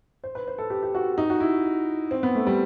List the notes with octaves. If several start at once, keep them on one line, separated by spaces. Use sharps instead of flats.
C5
B4
C5
A4
G4
G4
F#4
D#4
F#4
E4
C4
B3
A3
G3